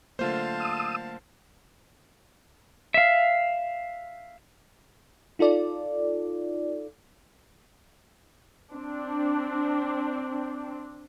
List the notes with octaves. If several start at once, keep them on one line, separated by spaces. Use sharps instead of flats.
D3 F#3 A3 A#3 F4 C5 F5 A5
D#6 E6
E5 F5
D#4 F4 A4 D5
C4 D4